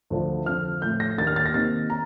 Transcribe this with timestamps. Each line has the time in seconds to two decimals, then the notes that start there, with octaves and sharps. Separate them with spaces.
0.10 D2 D3 F3
0.46 F2 D3 F3 F6
0.82 A2 F3 A3 G6
1.00 A#6
1.18 D#2 D#3 A#3 D4 A6
1.27 F6
1.36 A6
1.46 A#6
1.54 C3 D#3 A#3 D#4 A6
1.90 A#5